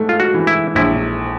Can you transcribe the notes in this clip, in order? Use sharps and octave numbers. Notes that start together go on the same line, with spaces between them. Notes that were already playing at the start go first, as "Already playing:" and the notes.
Already playing: G#2 A3
F4
F#4
E3
E4
A#1 E4